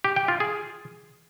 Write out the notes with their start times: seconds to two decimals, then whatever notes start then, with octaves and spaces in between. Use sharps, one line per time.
0.04 G4
0.16 G5
0.28 F4
0.40 G#4